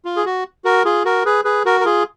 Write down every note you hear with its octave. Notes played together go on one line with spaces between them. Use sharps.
F4
G#4
F#4
F#4 A#4
F4 G#4
F#4 A#4
G#4 B4
G#4 B4
F#4 A#4
A#4
F4 G#4